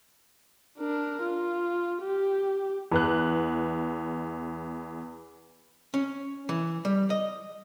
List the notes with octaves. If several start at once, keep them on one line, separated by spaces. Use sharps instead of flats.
D4 A#4
F4
G4
E2 B4 F#6
C#4
E3
G3
D#5